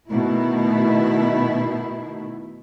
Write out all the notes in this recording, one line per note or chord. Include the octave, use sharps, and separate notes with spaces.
B2 D#3 A3 E4